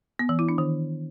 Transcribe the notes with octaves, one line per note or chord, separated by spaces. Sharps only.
B3
E3
E4
D4
D#3